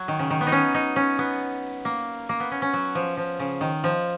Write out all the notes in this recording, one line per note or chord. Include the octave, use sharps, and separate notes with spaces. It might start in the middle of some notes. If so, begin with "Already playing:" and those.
Already playing: F#3
D#3
C#3
D#3
B3
D#4
C#4
D#4
C#4
B3
A#3
A#3
B3
C#4
C#4
F#3
F3
F3
C#3
D#3
F3